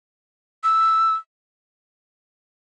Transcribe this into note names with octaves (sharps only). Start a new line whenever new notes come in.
E6